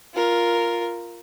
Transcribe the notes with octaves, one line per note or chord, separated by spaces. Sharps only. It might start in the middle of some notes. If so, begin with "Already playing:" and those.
F4 A#4